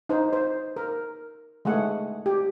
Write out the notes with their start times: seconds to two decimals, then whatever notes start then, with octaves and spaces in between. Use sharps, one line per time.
0.09 D#4 C5
0.33 C5
0.76 A#4
1.65 G#3 A3 G#4 F#5
2.26 G4